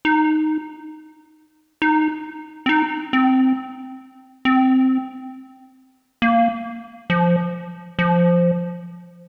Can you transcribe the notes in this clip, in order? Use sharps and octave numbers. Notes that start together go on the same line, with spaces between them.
D#4
D#4
C4
D#4
C4
C4
A#3
F3
F3